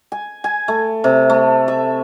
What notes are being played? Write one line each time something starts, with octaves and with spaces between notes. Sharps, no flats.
G#5
G#5
A3
C3
A3
E5